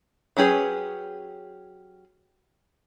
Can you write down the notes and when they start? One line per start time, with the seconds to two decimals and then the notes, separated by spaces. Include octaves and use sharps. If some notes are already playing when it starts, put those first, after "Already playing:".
0.37 F#3 C#4 G4 G#4 B4